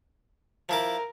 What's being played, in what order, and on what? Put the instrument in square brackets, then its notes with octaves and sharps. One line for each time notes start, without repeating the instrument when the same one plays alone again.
[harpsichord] F3 E4 D6 [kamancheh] A#4